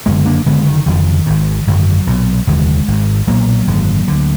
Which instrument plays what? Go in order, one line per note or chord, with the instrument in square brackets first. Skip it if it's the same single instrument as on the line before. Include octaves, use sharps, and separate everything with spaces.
[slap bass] F#1 F#2 D3 G#3 B3
A#3 D4
F#1 F2 D3 G#3 B3
D#3
F#1 F2 D3 D#3
G#1 G#2
G#1 F#2 D3 F#3
B1 A#2
F1 D#2 D3 G#3
G#1 G#2
B1 A#2 F#3 A#3
G#1 F#2 D3
D2 D3